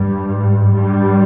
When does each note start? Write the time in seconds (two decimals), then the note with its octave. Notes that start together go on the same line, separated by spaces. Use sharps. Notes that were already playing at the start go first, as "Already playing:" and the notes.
Already playing: G2 G3
0.31 G#2
0.72 G2 G3